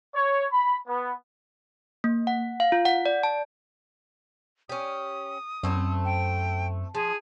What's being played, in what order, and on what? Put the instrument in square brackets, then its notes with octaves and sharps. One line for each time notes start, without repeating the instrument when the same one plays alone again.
[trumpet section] C#5
B5
B3
[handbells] A#3
F#5
F5
F4
F#5
D5
A5
[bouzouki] C#4 G4 [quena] D#6
[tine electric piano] F#2 [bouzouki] A3 C4 E4
[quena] G5
[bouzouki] F3 [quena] G#4